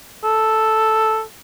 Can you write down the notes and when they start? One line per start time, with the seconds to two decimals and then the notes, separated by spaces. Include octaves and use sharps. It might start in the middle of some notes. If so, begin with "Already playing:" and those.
0.24 A4